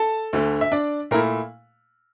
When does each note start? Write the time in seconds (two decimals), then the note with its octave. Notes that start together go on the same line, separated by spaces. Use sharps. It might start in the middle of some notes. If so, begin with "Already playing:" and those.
Already playing: A4 A5
0.33 D2 D3 A3
0.61 E5
0.72 D4 D5
1.11 A#2 A3 E4 A#4